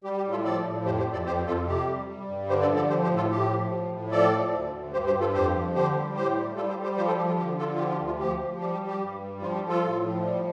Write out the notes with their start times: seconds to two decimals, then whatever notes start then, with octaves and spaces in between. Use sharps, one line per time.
0.04 G3 G4
0.18 G4
0.24 A2
0.31 F4 A4
0.44 F3 A4 D5
0.65 A2
0.85 F2 G4 C5
0.99 G4 C5
1.06 F2
1.13 A4 D5
1.26 F2 G4 C5
1.46 F2 F4 A4
1.67 C3 G4
1.88 G3
2.08 G3
2.28 G2
2.49 D3 G4 C5
2.62 A4 D5
2.69 F3
2.76 A4 D5
2.89 F3 G4 C5
3.03 G4 C5
3.09 A2
3.16 F4 A4
3.30 A2 G4
3.50 F3
3.71 A2
3.91 A2
4.11 F3 A4 D5
4.32 F3
4.52 D2
4.73 D2
4.93 G2 G4 C5
5.07 G4 C5
5.14 G2
5.20 F4 A4
5.34 F2 G4 C5
5.55 F3
5.74 D3 G4 C5
5.95 G3
6.15 A2 G4 C5
6.36 G3
6.56 G3 F4 A4
6.69 G4 C5
6.76 G3
6.83 G4 C5
6.97 F3 G4 C5
7.07 F4 A4
7.17 F3 G4
7.28 F4
7.38 D3 G4
7.58 D3 F4 A4
7.74 F4
7.79 F3 G4
7.88 F4
7.92 G4
7.99 D2
8.06 F4
8.19 F3 G4
8.40 F3
8.60 G3 G4
8.73 G4
8.81 G3
8.87 G4
9.01 G2
9.21 G3
9.41 F3 F4
9.55 G4
9.62 F3
9.69 F4 A4
9.83 A2
10.03 F3
10.23 G3